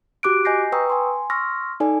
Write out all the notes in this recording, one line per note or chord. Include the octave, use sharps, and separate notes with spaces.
F#4 G4 D6 F#6 D7
D#5 G#5 G6 A#6 C7
B4 G5 A#5 C#6 D#6 E6
G#5 C6
C6 C#6 E6 F6 A#6
D#4 A4 D5 G#5